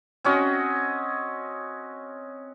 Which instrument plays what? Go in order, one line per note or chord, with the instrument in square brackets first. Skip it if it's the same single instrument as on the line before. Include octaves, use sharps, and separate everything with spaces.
[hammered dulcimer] C4 C#4 F#4 D#5